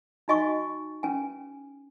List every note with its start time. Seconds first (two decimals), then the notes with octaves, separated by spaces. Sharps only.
0.28 D#4 F#4 D#5 G#5 C#6
1.03 C#4 B4 G#5